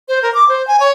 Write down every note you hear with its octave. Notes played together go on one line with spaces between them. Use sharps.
C5
A#4
D6
C5
G#5
C#5